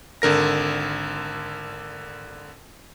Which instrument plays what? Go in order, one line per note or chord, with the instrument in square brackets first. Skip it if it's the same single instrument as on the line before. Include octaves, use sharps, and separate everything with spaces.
[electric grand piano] G#1 D3 A#4 A#6